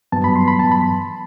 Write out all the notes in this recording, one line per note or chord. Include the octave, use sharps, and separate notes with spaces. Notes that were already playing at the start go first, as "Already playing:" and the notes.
G2 F#3 B3 A5
B5
C6
B5
A5
B5